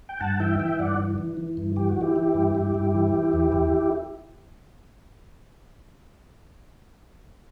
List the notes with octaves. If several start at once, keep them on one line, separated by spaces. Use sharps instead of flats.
G5
G2 F#5 A5
E3 E5 G5
E3 E5 G5
G2 D5 F#5
E3
E3
E3
G2
E3 G4
F#4
E3 E4 G4
E3
G2
G2
G2
E3
E3
E2
E2